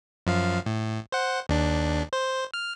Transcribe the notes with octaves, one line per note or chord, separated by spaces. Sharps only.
F#2 F3 F5
A2
C5 F#5
D#2 D4
C5
F6